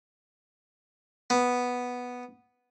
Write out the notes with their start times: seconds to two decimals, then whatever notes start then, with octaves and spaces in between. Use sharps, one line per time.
1.30 B3